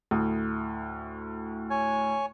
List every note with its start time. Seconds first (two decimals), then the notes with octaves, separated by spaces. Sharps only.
0.11 D2 A2 D#6
1.70 C#5 G#5